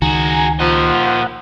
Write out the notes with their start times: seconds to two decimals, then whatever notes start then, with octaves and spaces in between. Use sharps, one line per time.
0.02 C#2 D#3 F#4 G#4 G#5 A#5
0.60 D#2 A#2 F3 D#5 F#5